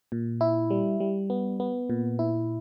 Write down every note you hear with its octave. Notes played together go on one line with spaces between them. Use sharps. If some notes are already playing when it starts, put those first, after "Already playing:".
A#2
E4
G3
G3
B3
B3
A#2
E4